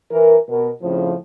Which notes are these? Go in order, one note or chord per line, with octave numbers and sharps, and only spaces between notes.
E3 A#4
B2 A#4
F2 A2 C#3 F3